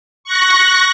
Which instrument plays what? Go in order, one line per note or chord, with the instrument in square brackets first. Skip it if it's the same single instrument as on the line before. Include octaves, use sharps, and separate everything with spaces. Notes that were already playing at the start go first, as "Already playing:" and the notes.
[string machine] C#6 F#6 A#6